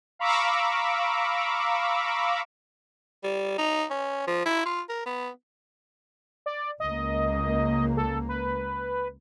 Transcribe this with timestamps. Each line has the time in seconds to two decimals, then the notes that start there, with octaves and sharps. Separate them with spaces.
0.19 F5 A#5 B5 C#6 D6 E6
3.24 G3
3.58 D#4
3.90 C#4
4.27 F3
4.46 E4
4.65 F4
4.89 A#4
5.06 B3
6.46 D5
6.80 C#2 A#3 D#5
7.97 A4
8.29 B4